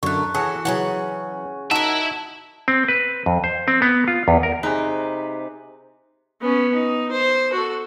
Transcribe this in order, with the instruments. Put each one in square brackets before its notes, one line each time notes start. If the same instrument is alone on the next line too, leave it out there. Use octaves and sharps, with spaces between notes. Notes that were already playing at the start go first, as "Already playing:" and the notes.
[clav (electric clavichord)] F#2 D3 [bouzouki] A3 A#4 [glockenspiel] C#6 F#6
[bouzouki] E3 F#4 A4 [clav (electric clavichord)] G#4 C#5 F#5
[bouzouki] C#3 C#4 F#5 [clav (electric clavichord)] E3 F#3
[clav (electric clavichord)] D#4 F#4 [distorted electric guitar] E4 E5 [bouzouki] A#4 F#5 [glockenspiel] A5
[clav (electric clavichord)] C4
B4
F2
C5
C4
B3
F4
E2
A#4
[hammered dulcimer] C3 B4 [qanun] D#4 [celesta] G#4 C5 G#5
[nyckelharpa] B3 C#4
D#4
C5
F#4 A4